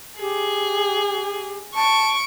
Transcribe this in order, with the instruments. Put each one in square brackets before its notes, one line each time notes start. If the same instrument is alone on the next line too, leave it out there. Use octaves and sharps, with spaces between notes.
[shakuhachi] G4 [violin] G#4
[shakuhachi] A5 [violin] C#6 D7